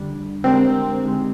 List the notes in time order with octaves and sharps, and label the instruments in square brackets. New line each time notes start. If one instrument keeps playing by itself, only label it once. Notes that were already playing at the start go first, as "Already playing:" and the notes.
Already playing: [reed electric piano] F2 D3 G3 D4
[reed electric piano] D3 G#3 D4 G4 A#4 [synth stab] C4
[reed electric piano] D3 G#3 D#4 G4